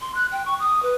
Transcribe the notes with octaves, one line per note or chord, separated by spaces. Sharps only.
C6
F#6
G5
C#6
D#6
B4